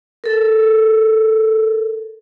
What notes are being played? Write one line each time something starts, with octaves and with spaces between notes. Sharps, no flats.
A4 A#4